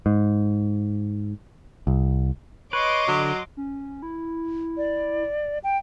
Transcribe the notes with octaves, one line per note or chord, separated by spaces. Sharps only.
G#2
C2
B4 C#5 D#5 C6 D6
D3 F#3
C#4
E4
D5
G5